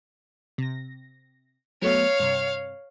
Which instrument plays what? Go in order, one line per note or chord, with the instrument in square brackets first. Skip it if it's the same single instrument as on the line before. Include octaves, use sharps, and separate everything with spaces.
[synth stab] C3 A#6
[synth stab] F#3 A3 B3 [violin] C#5 F5
[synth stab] G2 C3